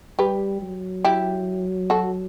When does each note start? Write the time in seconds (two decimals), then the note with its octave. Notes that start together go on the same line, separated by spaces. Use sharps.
0.19 G3 G4 B4
0.62 F#3
1.05 E4 G4
1.90 F#4 A4